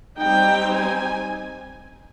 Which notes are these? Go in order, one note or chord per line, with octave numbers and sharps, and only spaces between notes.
G3 C4 D#4 G5
G#5